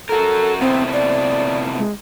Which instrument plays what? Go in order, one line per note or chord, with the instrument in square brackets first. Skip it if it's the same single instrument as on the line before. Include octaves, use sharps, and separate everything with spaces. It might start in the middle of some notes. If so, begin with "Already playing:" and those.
[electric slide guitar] F#4 A#4 [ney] A4
[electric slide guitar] A2 C3 B3 [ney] C4
[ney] D5
G#3